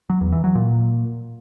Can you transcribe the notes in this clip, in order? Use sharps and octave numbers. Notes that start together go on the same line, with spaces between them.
F#3
E2
E3
F#3
A#2